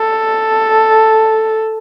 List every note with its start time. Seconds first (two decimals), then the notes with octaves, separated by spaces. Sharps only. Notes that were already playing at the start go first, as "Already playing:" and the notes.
Already playing: A4